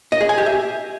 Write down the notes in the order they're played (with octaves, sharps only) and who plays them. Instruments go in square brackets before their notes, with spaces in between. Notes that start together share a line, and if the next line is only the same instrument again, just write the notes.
[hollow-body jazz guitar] D#5
G#4
G#5
G4
E5